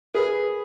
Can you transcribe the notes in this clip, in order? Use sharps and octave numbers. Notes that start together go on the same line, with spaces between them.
G#4 B4